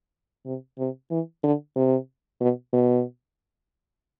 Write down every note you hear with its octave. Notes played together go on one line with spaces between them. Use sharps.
C3
C3
E3
D3
C3
B2
B2